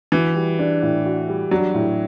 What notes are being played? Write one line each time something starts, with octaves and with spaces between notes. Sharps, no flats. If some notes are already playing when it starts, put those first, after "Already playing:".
E3 F#4
G3
D4
A2
F#4
G3
F#3 D4
A2